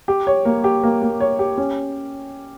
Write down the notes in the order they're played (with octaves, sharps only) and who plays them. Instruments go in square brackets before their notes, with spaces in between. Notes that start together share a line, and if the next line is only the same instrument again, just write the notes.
[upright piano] G4
C#5
A#3
G4
A#3
A#3
C#5
G4
C#4